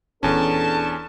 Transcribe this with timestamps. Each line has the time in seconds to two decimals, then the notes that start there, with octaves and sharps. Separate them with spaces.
0.23 D#1 E2 C#4 D4 G#4 A4 A5